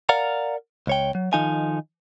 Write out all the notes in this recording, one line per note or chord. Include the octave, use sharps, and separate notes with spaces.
A#4 D5 F5 F#5 A#5
C#2 C#5 G5
F#3
D#3 F3 D#4 A4 F5 G#5